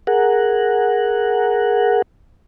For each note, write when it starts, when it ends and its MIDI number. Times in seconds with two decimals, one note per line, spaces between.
0.07 2.02 68
0.07 2.02 70
0.07 2.02 78